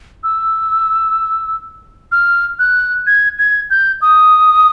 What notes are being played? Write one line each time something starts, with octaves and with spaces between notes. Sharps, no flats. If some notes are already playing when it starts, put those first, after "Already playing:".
E6
F6
F#6
G#6
G#6
G6
D#6